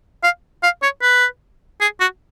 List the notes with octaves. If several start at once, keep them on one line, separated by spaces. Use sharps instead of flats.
F5
F5
C#5
B4
G#4
F#4